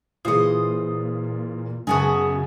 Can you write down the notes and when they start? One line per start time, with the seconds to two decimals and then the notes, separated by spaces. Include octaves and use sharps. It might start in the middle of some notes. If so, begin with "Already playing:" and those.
0.25 A#2 E3 F4 G#4 C5 D#5 D#6
1.87 F#2 C#3 B3 F#4 G#4 A5